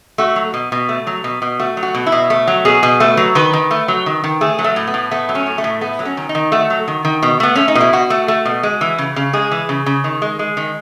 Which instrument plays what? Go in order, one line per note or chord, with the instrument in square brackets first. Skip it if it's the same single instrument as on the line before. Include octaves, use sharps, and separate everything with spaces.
[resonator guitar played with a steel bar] A3 F#4
F#3
B2
B2
A3
F#3
B2
B2
A3 F#4
F#3
F#4
B2
E4
B2
A3
F#3
B2 G#4
B2
A3 B4
F#3
D#3 B4
D#3
A3
F#3
D#3
D#3
A3 G#4
F#3
A3
A2
B3
A2
A3 B3
F#3
C#4
A2
A3
A2
A3 B3
F#3
C#4
D#3
D#4
D#3
A3 F#4
F#3
D#3
D#3
B2
A3 B3
A3 C#4
D#4
B2
E4
B2 F#4
A3
A3
B2
G#3
E3
C#3
C#3
G#3 G#4
E3
C#3
C#3
D#3
G#3
G#3
D#3